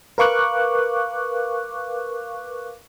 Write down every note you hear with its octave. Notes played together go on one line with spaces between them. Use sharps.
A#4 B4 F5 C#6 D6 F#6